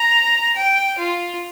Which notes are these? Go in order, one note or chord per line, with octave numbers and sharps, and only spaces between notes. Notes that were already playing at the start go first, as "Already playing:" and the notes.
Already playing: A#5
G5
F4